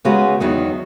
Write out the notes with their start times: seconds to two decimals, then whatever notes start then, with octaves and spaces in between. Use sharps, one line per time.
0.05 C#3 G#3 B3 F#4
0.40 E2 D#3 F#3 B3